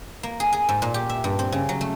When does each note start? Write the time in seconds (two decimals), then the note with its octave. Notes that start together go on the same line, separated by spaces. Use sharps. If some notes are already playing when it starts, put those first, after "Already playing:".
0.23 A#3
0.40 G#4
0.53 G#4
0.69 G#2
0.82 A#2
0.94 G4
1.09 E5
1.24 G2
1.39 C4
1.52 C#3
1.69 F#3
1.81 A3